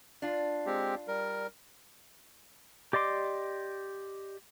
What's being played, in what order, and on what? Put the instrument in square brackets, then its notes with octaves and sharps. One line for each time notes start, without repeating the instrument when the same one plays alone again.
[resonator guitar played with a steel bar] D4 F4
[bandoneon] G#3 C4 G4
G3 A#4
[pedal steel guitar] G4 D5 D#5 C6 D6